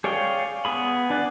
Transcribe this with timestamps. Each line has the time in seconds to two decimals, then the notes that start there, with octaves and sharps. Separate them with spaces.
0.04 G#4 C#5 D5 F5 G5
0.65 B3 G#4 B5
1.10 D4 D5 F#5